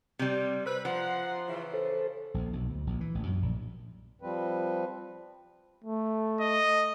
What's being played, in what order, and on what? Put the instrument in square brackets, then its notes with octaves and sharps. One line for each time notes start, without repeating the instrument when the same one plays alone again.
[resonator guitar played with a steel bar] C3 G3
[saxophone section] B4 [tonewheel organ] C5 E6
[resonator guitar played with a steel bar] F3 [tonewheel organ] C5 A#5 C6 [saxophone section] F#5
[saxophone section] C#3 E3
[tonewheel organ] A4 C5
[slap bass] A#1
B1
D2
A#1
E3
A1
F#2
A#1
[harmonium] F3 G3 C4 B4
[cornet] A3
[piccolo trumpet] D#5